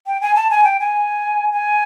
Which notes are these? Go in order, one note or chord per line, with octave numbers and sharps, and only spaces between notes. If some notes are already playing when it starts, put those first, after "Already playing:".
G5
G#5
A5
G#5
G5
G#5
G#5